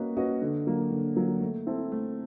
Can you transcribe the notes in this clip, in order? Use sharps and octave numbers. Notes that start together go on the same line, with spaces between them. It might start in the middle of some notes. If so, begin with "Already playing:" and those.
Already playing: A#3 C#4 F#4 B4 D#5
C#4 F#4 B4 D#5
D3
F#3 A#3
D3
F#3 A#3
A3
C4 E4 A4
A3